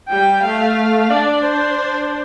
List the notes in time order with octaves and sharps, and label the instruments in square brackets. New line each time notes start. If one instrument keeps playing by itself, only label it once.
[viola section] G3 [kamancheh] G5
[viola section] A3 [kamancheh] F5
[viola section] D4 [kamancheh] D5
[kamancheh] C5